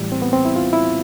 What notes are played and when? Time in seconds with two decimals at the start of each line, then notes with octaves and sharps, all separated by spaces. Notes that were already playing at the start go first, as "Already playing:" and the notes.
Already playing: A2 E3 G3
0.12 C4
0.22 B3
0.33 C4
0.45 E4
0.56 F4
0.73 E4